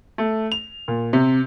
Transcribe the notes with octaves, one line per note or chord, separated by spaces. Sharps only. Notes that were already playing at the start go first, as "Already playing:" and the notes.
A3
F7
A#2
C3